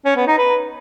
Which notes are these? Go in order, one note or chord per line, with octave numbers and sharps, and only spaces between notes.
C#4
B3
D#4
B4